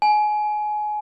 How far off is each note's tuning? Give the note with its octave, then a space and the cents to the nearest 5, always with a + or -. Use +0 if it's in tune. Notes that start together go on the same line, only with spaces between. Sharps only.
G#5 +25